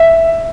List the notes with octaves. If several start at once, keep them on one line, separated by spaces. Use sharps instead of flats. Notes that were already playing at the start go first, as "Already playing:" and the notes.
Already playing: E5